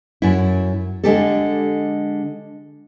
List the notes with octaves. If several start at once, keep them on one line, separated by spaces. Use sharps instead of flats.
F#2 E4
D3 G#3 G4 A4